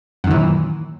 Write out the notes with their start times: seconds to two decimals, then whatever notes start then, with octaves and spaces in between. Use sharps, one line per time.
0.24 F#2
0.27 D#3
0.30 E3
0.34 A#2